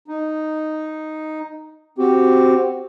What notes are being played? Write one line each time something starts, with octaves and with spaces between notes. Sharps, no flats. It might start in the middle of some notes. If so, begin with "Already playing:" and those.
D#4
C4 F#4 G4